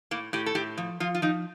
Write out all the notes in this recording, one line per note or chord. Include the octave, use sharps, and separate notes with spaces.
A2 A#3
A2 G4
A4
A2 G4
F3
F3 F4
F4
F3 D#4